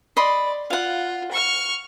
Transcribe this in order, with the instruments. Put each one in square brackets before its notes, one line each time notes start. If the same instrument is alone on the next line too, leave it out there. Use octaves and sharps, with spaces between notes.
[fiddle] D5 [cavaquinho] D#5 B5 C6
[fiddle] F4 [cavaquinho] F5 F#5
[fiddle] C#6 F6